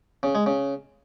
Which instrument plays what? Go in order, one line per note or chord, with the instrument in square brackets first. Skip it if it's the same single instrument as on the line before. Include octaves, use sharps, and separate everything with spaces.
[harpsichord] C#3
G#3
C#3